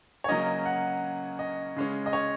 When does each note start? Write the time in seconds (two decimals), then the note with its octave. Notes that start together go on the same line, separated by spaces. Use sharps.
0.24 C#5
0.29 C#3 F#3 A#3 C#4 D#5
0.66 F#5
1.39 D#5
1.76 C#3 G#3 C#4
2.06 D#5
2.13 C#5